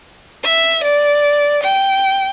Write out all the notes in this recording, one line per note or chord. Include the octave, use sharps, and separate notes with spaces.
E5
D5
G5